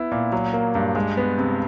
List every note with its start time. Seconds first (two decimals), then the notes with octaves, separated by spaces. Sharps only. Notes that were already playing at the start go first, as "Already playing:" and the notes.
Already playing: B3 E4
0.11 A#2
0.32 F#3
0.53 A#3
0.75 G2
0.95 G#3
1.17 B3
1.38 C3